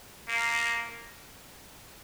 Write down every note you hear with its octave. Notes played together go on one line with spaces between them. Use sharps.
A#3